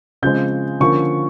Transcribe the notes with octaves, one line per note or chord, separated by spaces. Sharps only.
C#3 F3 G#3 C4 G6
D3 F3 A#3 C#4 C#6